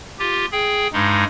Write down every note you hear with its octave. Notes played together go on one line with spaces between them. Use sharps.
F4 G4
G#4 G5
G2 G#3 D#4